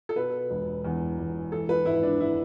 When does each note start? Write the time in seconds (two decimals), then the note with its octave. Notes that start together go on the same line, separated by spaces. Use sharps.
0.09 A4
0.16 B2 B4
0.51 E1
0.85 E2
1.18 E1
1.52 E3 A4
1.69 B4
1.85 G#1 E4
2.03 D4
2.20 E4